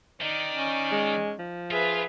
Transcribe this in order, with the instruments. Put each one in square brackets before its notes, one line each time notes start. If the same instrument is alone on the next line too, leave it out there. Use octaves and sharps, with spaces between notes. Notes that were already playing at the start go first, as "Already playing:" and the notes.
[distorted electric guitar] D#3 [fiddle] D#4 D5
[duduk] C#4
[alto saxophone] G#3
F3
[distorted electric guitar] F4 [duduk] G#4 [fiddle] B4 E5